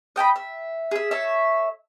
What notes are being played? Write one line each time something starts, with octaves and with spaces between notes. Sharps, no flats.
D#5 G5 G#5 B5
E5
G#4 E5
A4 C#5 E5